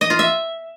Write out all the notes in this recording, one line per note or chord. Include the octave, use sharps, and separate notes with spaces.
D#5
F4
E5